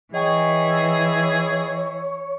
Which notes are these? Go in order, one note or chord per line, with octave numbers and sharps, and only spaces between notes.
E3 G#4 C#5 D#5 G5 G#5